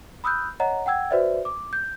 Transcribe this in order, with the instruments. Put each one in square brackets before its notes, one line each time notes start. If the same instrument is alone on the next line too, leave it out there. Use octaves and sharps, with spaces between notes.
[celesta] B5 D#6 E6 F#6 G6
C#5 D#5 F#5 A#5
F#5 G5 E6 G#6
F#4 B4 C5 D5 E5
D6
G6